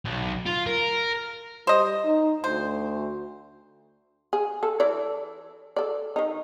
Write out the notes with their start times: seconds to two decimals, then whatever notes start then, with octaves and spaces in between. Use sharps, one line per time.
0.06 B1
0.46 F4
0.67 A#4
1.67 G3 C5 D#5
2.05 D#4
2.44 D2 C5
4.33 G#4
4.63 A4
4.80 E3 A4 D5
5.76 A4 D5
6.16 D#3 D#4